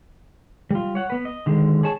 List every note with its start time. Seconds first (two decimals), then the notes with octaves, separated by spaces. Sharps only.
0.71 G3 F4
0.95 C#5 F#5
1.10 B3 B4
1.25 D#5
1.46 D3 D#3 G#3
1.83 G#4 C#5 A5